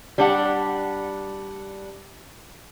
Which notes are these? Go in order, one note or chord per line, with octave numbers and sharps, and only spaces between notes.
G3 D4 F#5